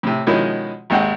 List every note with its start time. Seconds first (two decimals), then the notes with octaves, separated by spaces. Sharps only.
0.03 A2 C3
0.27 B2 D#3 F3 G#3 C#4 E4
0.90 G#1 D#2 G#3 F#5 G5